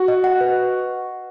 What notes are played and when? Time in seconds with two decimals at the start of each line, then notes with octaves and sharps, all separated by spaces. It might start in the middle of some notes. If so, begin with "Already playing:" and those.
Already playing: F#4
0.08 D#5
0.24 F#5
0.41 B4